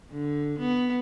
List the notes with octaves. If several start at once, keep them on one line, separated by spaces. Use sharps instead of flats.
D3
B3